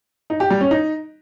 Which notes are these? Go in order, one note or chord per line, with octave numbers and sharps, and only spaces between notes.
D#4
G4
G3
C#4
D#4